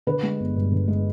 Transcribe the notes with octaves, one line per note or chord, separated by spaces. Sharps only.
D3 B4
G#3
G1
G2
D3
G#3